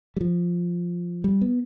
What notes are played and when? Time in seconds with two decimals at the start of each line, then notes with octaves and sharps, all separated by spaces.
0.16 G3
0.21 F3
1.24 G3
1.41 B3